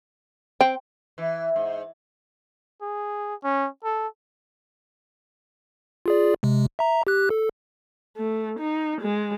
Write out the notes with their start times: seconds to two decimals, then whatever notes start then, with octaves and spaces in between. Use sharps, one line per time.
0.61 C4 G5
1.18 E3
1.56 G#2
2.82 G#4
3.43 C#4
3.84 A4
6.06 F4 G#4 D5
6.43 C3 G#3
6.79 E5 A#5
7.07 G4 F#6
7.30 A4
8.17 A3
8.59 D#4
9.01 G#3